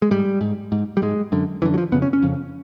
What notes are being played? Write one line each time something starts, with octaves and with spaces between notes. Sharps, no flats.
G#3
G#2 G3
G#2
G#2
G3
G#2 G#3
F#2 D3
F#2 D3 E3
F#3
F3
F2 C#3 B3
C#4
C#4
F2 C#3